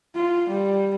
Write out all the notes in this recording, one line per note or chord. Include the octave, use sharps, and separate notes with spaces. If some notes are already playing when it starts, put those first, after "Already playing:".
F4
G3